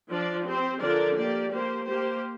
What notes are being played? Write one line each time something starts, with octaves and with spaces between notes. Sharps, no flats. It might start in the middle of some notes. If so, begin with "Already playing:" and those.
F3 D4 F4 D5
C4 G4 C5
D3 F3 D4 A#4 D5
A#3 G4 D5
A#3 G4 C5
A#3 G4 C5